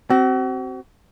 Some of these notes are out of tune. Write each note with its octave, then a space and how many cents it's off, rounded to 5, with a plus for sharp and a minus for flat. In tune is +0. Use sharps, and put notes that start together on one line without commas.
C4 +0 F#4 +40